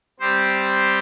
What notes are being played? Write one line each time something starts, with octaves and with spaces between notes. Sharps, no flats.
G3 C4 G4 C5